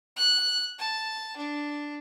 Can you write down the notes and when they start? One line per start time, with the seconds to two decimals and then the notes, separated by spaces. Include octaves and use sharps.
0.16 F#6
0.79 A5
1.37 D4